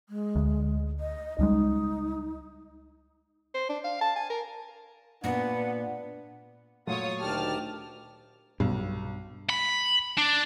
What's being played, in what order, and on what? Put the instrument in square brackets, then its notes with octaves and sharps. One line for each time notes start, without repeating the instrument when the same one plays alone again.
[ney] G#3
[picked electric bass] D2
[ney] D#5
[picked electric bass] C#2 G3 G#3 [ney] D#4
[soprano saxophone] C5
D4
F5
A5
G#5
A#4
[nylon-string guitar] A#2 [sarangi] B3 [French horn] D4 [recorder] F#5
[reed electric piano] A#2 A3 [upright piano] F#3 [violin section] F4 C#5 D#6
[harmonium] D2 D#3 G4 [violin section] D5 A5 F6
[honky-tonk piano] B1 [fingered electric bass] G2
[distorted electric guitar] B5
D4